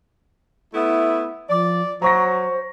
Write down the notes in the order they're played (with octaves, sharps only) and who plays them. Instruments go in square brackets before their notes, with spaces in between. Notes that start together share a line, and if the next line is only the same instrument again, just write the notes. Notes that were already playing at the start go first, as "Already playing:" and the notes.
[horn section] A3 B3 E4
[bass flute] F3 [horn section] D5
[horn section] F#3 [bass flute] C5 [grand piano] A#5 C#6 A#6